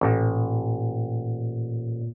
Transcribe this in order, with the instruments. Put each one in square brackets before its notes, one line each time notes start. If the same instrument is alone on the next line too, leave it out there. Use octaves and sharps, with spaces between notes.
[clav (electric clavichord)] A1 [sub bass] A#2